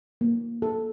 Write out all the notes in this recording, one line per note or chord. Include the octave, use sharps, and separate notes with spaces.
A#3
A4